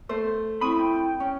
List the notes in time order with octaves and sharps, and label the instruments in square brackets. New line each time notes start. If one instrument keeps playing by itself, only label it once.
[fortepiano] A3 [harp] C5
[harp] C4 D#6 [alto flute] E4 [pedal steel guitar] B5 C#6
[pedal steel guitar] G5
[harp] C#4